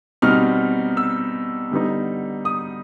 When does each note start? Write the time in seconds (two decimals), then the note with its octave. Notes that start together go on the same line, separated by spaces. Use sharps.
0.22 B2 G3 C4 D#4 F6
0.97 E6
1.71 D3 G3 B3 D#4
2.45 D#6